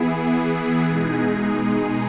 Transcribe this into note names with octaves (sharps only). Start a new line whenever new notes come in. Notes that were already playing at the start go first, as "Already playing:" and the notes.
Already playing: E3 B3 E4 G#4
B2 G#3 D#4 G#4